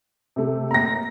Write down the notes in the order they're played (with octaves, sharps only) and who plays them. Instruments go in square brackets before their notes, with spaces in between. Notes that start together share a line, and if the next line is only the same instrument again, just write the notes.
[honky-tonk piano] C3 A3
[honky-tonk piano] A#3 [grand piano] A#5 A#6